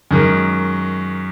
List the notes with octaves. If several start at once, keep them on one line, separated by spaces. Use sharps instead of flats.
F#2 D#3 G#3